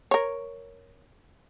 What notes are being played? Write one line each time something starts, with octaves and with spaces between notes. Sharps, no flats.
A#4 C#5